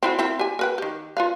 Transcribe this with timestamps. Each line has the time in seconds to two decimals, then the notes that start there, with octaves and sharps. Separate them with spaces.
0.03 C4 E4 F#4
0.19 C4 E4 A#4
0.39 G4 G#5
0.59 A#4 B4 G5
0.78 D#3 G4
1.17 F4 B4 F5